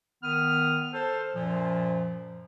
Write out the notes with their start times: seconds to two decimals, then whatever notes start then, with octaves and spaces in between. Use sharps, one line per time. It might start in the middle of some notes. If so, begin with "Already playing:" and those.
0.23 D#3 B3 D#6 F6
0.93 A4 C5
1.35 F#2 A#2 F3